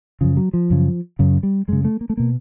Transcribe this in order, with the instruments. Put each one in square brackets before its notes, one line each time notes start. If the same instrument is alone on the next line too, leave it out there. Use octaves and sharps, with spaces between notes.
[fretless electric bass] F#2 C#3 F3
F#3
F3
F#2 C#3
F#2 C#3
G3
F#2 C#3 G#3
A3
A#3
A3
B2 A#3